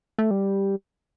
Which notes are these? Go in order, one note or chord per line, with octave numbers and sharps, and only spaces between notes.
A3
G3